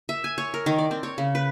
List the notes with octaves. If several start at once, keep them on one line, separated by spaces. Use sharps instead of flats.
E5
G#5
C#5
A#4
D#3
D5
C4
C#5
C#3
B4